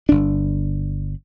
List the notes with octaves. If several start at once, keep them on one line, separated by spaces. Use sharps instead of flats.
G1 D4